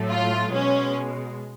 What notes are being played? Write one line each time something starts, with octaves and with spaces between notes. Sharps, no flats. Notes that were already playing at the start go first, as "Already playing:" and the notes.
Already playing: A2 F#3 A3
F4
B2 G#3 C#4